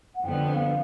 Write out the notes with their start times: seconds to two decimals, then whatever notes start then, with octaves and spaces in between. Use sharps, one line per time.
0.15 F#5
0.24 F2 D3 G3 B3 G5
0.54 F5